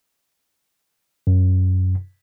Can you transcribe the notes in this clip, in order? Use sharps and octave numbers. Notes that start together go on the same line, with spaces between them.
F#2